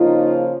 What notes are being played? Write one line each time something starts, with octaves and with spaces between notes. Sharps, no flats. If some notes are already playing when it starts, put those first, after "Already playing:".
Already playing: C#3 F3 A#3 D#4 F4